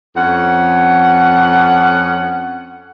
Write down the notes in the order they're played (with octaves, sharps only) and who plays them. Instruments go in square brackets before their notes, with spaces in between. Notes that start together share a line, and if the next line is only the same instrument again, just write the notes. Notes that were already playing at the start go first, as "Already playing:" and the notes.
[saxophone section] F2 C#4 F#5